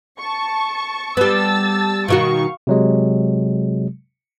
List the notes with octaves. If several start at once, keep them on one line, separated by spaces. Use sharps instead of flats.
A5 C#6
G3 B3 A5 E6 A6
B2 D#3 F#4 F5 C#6
C3 F#3 G#3